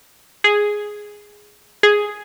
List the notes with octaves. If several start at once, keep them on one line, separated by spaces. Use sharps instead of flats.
G#4
G#4